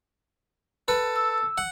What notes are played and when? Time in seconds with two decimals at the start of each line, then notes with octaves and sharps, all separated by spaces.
0.88 A4 B4
1.16 E6
1.58 F#5